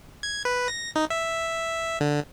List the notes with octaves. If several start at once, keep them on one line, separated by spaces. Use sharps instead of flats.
G#6
B4
A#6
D#4
E5
D3